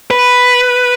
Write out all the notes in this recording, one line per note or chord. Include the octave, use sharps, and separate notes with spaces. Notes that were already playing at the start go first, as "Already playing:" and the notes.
B4